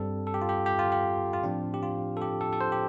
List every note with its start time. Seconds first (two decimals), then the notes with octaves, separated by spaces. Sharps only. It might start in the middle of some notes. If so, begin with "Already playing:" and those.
Already playing: G2 G3 C4 A4
0.27 A4
0.34 G4
0.42 F4
0.49 G4
0.66 G4
0.79 F4
0.92 G4
1.33 F4
1.44 A2 F3 C4 D4
1.74 G4
1.83 F4
2.17 A4
2.22 G4
2.41 A4
2.53 A4
2.61 C5
2.72 G4